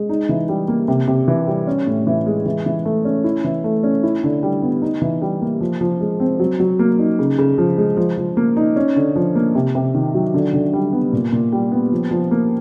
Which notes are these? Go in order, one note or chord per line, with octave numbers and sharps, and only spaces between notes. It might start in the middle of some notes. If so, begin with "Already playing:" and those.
Already playing: G#3
D#4
E3
G3
A#3
C3
C3
E3
G3
C#4
A2
E3
G#3
E3
E3
A3
C#4
E4
E3
A3
C#4
E4
D3
G3
B3
D#4
E3
G3
A#3
F3
F3
G#3
C4
F#3
F#3
A#3
D#4
C#3
C#3
F3
G#3
F3
F3
A#3
D#4
C#4
D3
F3
A#3
C3
C3
D#3
F#3
D3
D3
G3
B3
A#2
A#2
G3
B3
F3
F3
A#3